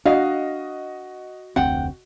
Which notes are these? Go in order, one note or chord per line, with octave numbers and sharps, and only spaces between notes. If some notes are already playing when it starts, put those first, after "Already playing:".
D4 F#4 D#5 F5
F1 D2 C4 F#5 G5